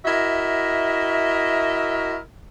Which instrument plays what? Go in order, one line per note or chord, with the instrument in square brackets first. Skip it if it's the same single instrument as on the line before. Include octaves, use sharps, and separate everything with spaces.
[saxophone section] E4 F#4 A#4 D#5 E5